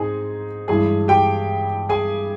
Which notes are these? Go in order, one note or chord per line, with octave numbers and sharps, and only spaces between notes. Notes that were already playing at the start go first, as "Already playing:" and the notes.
Already playing: G#2 C4 D#4 G#4 G#5
G2 E3 G#3 G#4 G#5
G4 G5
G#4 G#5